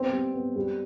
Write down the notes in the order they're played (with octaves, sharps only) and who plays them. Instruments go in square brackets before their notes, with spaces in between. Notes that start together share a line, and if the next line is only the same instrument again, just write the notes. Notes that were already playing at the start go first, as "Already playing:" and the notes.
Already playing: [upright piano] B3 G4 [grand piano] C4
[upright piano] G3
B3
G3